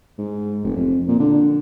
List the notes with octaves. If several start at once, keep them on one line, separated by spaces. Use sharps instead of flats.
G#2
F1
F2
A#2
D3